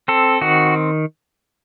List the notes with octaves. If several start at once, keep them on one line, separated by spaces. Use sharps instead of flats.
C4 A4
D#3 F#4